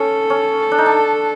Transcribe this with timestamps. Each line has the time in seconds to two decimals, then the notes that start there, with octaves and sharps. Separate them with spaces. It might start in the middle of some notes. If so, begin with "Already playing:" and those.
Already playing: C#4 A4
0.30 C#4
0.72 D4
0.78 D#4
0.86 D4